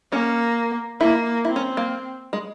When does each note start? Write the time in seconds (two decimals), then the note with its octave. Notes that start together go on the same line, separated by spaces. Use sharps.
0.12 A#3 C#4
1.01 A#3 E4
1.45 C4 E4
1.56 C#4
1.77 A#3
2.33 G#3